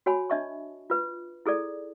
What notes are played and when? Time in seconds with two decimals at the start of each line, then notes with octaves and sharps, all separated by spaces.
0.06 F#4 C#5 G#5 B5
0.30 D4 D#5 E5 A5 C#6
0.90 F4 B4
1.46 E4 G#4 A4 D5